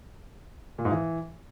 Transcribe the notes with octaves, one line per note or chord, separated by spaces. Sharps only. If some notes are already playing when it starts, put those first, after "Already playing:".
A#2
G#2
E3